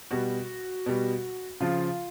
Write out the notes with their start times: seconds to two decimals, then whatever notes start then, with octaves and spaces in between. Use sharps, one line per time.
0.11 B2 G3 F#4
0.86 B2 G3
1.60 C#3 F3 F4